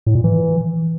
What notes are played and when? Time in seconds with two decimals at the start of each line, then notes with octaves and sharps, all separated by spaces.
0.07 A2
0.15 A#2
0.24 E3